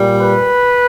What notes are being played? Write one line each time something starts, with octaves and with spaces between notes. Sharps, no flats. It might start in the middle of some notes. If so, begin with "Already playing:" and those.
Already playing: A#2 G3
B4